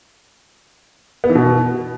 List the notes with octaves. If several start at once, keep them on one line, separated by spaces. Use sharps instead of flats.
B3
E3
B2